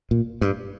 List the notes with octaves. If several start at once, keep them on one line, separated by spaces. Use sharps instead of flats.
A#2
G2